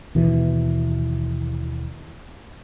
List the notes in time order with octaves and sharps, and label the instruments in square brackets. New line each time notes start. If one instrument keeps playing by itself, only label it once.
[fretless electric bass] D#2 B2 E3